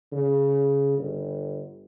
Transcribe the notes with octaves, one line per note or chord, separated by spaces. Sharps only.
C#3
G1